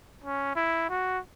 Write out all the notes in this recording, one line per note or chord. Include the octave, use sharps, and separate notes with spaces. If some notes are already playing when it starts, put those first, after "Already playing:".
C#4
E4
F#4